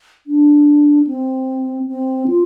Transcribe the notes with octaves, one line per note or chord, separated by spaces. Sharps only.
D4
C4
C4
F4